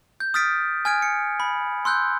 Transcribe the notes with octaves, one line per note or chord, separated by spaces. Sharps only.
G6
D#6 F6 A6 B6 D7
G#5 F6 G#6 D7
C#7
B5
C6 E6 F#6 G6